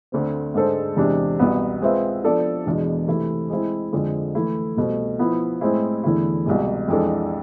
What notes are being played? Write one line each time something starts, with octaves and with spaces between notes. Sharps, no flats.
D2 D3 A3 C4
G#2 G#3 D4 A4 C5
E2 C3 G#3 D4
C2 B2 B3
G#3 C4 F4 B4 E5
F3 B3 D4 A4 D5
E2 B2 G#3 D4
C3 E3 A3 E4
G#3 C4 E4
F2 D3 F3 G#3
E3 A3 E4
C2 B2 A3 C4
F3 B3 E4
A2 G#3 C4 E4
E2 D3 A3 E4
C2 B2 G#3
F2 E3 G#3 D4 A4